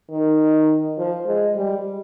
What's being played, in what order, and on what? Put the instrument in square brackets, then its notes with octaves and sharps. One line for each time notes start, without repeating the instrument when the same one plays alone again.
[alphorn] D#3
F3
G#3
G3